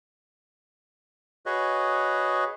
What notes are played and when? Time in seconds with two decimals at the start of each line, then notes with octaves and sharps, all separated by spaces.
1.46 F#4 G#4 B4 C#5 D#5